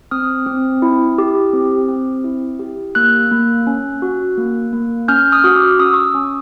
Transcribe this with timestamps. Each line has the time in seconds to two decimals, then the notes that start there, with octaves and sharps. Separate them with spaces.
0.11 C4 D#6 F6
0.46 C4
0.82 E4
1.18 G4
1.53 C4
1.88 C4
2.24 E4
2.59 G4
2.95 A#3 E6 F#6
3.31 A#3
3.67 C#4
4.02 F#4
4.37 A#3
4.73 A#3
5.08 C#4 F6 G6
5.32 D#6 F6
5.44 F#4
5.56 D6 E6
5.79 C#4 D#6
5.86 E6
5.94 C#6 D#6
6.14 C#4